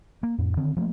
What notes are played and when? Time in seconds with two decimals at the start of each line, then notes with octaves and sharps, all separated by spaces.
0.23 A#3
0.38 F2 A2
0.57 D3 D#3 C4
0.77 F3 A3 A#3